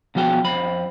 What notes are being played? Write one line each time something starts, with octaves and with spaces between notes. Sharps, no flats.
B2 F3 F#4 G5
F2 C4 B5